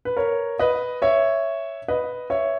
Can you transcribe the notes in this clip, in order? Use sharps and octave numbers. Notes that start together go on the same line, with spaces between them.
B4
A#4 C#5
B4 D#5
C#5 E5
B4 D#5
C#5 E5